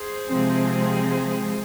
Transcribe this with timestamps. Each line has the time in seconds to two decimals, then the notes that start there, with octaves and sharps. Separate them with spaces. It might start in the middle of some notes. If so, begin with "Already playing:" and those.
Already playing: G#4 C5
0.28 C3 F3 G#3 C4